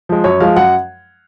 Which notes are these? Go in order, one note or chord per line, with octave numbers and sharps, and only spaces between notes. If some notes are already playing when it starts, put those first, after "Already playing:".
F3 G#3
F#2 C#5
F3 G#3 F5
F#2 F#5